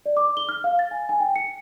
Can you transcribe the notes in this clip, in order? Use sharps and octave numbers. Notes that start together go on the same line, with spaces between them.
D5
D6
G7
F6
F5
A6
G#5
G#5
G5
C#7